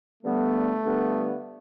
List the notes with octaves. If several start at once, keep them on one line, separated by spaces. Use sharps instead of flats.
G2 D3 G3 A3 B3
G2 D3 G3 B3